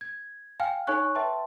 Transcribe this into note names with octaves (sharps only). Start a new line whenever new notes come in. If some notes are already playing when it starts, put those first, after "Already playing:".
G#6
F5 G5 G#5 F6
D#4 A4 C#5 G#5 C#6 F#6
B4 E5 G5 A5 C6